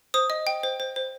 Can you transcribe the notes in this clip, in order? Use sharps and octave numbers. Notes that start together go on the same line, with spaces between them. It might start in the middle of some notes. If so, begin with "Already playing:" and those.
C5 D#6
D#5
G5
C5
C5
C5